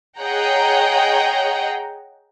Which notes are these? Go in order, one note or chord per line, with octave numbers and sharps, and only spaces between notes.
G#4 C#5 D#5 F#5 G5 A#5